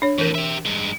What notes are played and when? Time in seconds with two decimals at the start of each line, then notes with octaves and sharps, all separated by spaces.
0.02 D4 C#5
0.18 F2 A2 E3 A#4
0.35 G4 E5
0.66 G2 G#3